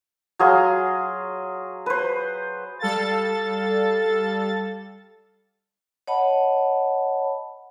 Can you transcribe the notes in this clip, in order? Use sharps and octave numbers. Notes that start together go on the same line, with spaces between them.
F#3 G#4 F5 C6
B4 C5
G3 A4 F5 A6
C#5 D#5 F#5 A5 B5